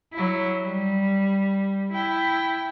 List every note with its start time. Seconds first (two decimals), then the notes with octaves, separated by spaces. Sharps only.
0.13 F#3 E4
0.60 G3
1.92 E4 G5